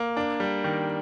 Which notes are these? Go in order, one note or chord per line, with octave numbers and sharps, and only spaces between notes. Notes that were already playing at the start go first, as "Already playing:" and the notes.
Already playing: A#3
D4
G3
D#3